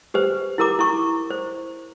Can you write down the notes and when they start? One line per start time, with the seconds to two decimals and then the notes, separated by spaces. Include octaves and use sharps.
0.14 G4 B4 C5
0.58 E4 G4 A#4 A#5 D6
0.79 E4 A#5 C#6
1.31 C5